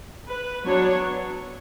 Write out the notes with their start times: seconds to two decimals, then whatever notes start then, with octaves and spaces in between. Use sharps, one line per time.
0.28 B4
0.65 F#3 B3 D4 C#5